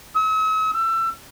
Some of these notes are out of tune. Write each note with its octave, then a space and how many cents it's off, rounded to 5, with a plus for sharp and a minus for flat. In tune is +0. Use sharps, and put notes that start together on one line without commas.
E6 -45
E6 +25